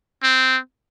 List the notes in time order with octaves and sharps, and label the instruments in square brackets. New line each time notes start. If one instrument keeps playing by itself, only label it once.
[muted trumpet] C4